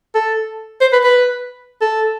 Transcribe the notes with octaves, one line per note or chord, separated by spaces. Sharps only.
A4
C5
B4
B4
A4